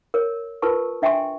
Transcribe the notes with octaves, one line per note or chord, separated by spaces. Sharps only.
A#4 C#5
F4 A#4 B4 A5 C#6
D4 E5 G5 G#5 C6 C#6